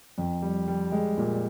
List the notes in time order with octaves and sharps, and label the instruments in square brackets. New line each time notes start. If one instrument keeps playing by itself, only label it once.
[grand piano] F2
G3
G3
G#3
A#2